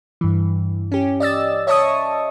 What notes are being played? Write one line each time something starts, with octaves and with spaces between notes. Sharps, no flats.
G2 E3
C#4 G4
D5 D#5 E6 A6
C#5 D#5 E5 A5 C#6 D#6